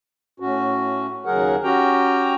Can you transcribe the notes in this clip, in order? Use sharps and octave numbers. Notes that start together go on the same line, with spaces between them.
A2 C#4 F#4
D#2 C#3 F#3 G#4 A#4 F#5
C#4 F#4 G4 G5 A#5